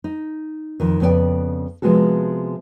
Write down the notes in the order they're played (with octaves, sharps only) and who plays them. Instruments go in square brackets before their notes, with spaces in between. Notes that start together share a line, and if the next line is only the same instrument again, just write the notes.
[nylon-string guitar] D#4
F2 D#3
F2 C#3 B3 D4 D5 G5
C3 F3 G#3 B3 F#4 A4